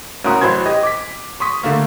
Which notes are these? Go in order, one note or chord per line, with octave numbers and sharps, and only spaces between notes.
C2 C#4 F#4 A#4 C6 D#6
A1 F#3 C5 B5 C6 G#6
G4 D#5
D6 B6
C6 C#6 D#6 B6
D3 A3 A#3